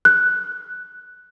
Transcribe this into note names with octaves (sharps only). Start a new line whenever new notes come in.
F#6